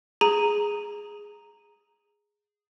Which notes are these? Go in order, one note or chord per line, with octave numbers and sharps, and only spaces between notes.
G#4 A#5 D#7